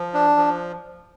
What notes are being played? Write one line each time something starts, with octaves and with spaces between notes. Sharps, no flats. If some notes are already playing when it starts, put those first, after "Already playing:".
Already playing: F3
D4
F3